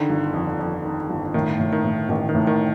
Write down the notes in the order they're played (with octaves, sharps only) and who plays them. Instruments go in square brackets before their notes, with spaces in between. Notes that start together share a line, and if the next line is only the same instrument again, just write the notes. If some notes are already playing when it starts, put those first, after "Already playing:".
Already playing: [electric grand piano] D3 [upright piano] D#3
[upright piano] G1
F2
F2
D#3
G1
[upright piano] A2 [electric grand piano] D#3
[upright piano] A2
[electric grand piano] D#3
[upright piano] A2
[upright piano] A1 [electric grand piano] D#3
[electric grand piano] D#3
[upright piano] A2
[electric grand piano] D#3